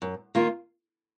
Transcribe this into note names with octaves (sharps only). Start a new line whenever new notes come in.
F#2
D#3 A#3 F4